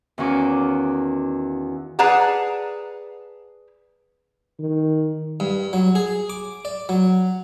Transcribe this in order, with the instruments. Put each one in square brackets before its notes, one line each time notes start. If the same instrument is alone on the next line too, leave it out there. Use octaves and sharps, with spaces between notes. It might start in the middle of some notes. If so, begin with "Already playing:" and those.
[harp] E2 D#3 C#4 F#4 F5 D6
[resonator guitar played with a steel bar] G#4 B4 D5 F#5 A5 A#5
[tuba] D#3
[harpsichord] G2
F#3
G#4
D6
D5
F#3